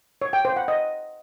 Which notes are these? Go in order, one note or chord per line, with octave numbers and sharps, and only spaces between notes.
C#5
G5
C5
F#5
D#5